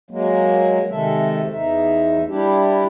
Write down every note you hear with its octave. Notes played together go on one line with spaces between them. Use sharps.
F#3 G#3 A#3
C3 D#3 G#3 A4 E5
E2 D#4 E5
G3 D4 E4 G4